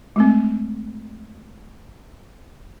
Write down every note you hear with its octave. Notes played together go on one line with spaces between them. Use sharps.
G#3 A3 C4